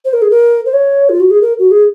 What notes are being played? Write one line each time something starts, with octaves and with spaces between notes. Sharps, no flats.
C5
A#4
G#4
A#4
C5
C#5
F4
F#4
G#4
A#4
F#4
G#4